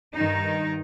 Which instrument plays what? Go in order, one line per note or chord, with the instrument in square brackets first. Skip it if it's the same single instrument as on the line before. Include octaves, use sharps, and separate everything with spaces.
[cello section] G2 D#3 D#4